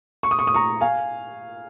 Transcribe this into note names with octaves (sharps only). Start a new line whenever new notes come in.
C#6
D#6
C#6
D#6
A#5 C#6
F5 G#5